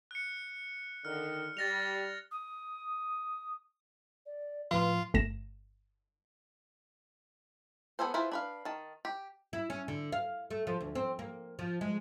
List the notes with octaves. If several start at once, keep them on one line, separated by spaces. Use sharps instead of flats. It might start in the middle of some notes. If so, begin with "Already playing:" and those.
F#6 C#7
D3 D#3 F6
G3 A6 A#6 F7
D#6
D5
A2 F3 F4 B4
G1 A3 A#6 E7
B3 G#4 A4 C5
E4 F4 G#4 B4 C5
D4 B4 F5
D#3 A5
G4
E4
C#4
D3
F5
A3
F3
D2
C4
A#3
F3
G#3